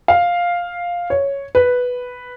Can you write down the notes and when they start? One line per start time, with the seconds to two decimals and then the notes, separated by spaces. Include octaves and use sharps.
0.08 F5
1.10 C#5
1.55 B4